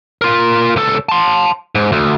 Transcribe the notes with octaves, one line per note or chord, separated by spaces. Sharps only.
F4 A#4
C#2 A4
A5 C6
G#2
D2